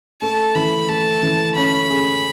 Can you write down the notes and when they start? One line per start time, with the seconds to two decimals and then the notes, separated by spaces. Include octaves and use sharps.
0.22 A3 A5
0.55 E3 B5
0.89 A3 A5
1.23 E3
1.56 C#4 B5
1.90 G#4